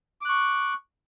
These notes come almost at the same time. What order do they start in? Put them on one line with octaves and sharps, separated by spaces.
D6 F#6 C#6